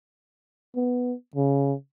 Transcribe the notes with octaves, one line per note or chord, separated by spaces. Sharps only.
B3
C#3